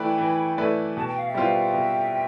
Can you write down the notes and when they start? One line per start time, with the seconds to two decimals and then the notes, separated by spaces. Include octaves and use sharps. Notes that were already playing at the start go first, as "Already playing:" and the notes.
Already playing: E3 A3 E4 B4 D5 G5 B5
0.18 E3
0.58 A3 E4 B4 D5
0.96 B2 A5
1.07 G5
1.18 F5
1.28 E5 G5
1.35 G3 B3 F4 C5
1.73 B2